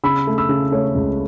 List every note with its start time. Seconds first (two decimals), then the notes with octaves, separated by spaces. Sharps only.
0.03 C#3 B5 E6
0.27 A3
0.38 B5 E6
0.49 C#3
0.72 A3 A4 C#5
0.95 C#2